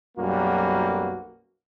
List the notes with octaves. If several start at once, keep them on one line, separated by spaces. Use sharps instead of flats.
B1 F#2 G3 A#3 F#4